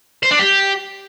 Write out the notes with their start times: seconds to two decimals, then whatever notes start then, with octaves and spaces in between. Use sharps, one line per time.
0.23 C5
0.31 D4
0.39 G4